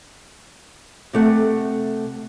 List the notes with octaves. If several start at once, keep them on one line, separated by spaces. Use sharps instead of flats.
C3 A3 F#5